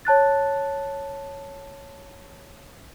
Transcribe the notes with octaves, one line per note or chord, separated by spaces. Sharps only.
C#5 A5 F#6 A6